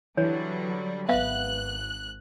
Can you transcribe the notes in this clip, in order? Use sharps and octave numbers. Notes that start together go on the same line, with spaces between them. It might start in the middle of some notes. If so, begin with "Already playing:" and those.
D3 E3 F#3 G3 C#5
G#1 B3 E5 F5 F#6